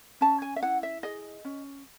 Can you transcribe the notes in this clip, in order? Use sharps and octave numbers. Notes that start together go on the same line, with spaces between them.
C#4 A5
G#5
E5
E4 F#5
E5
G#4 D#5
C#4